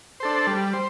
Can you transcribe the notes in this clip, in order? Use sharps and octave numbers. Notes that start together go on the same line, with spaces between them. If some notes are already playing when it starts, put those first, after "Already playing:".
D4 A4 C5
G3
C5